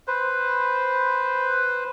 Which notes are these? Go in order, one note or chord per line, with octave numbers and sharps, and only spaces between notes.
B4 C5